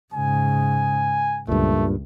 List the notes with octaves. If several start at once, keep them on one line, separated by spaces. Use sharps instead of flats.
G#2 C#3 G#5
C#2 G2 A#2 A3